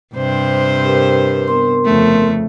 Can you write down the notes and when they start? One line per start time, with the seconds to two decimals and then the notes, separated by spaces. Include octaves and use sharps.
0.15 G2 C3 C5
0.85 G4 A#4 B4
1.48 B3 A#4 C6
1.85 F2 C#3 A3